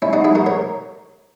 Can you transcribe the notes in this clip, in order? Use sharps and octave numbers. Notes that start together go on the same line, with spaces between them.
C#4 E4
D#4 F#4
E4 G#4
F#4 A#4
A#4 C#5